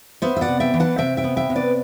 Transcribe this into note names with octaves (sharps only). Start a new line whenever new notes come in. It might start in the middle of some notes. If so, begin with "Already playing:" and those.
B3 C5 E5
E5
D5 F#5
C3
E5 G5
E3
F#5 A5
C3 E5 G5
E5 G5
B3
E5 G5
C3
B4 D5